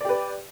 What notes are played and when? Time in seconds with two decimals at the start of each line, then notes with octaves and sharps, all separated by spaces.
0.01 D5
0.05 G4
0.09 B4